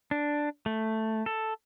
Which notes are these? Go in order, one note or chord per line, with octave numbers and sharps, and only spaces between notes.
D4
A3
A4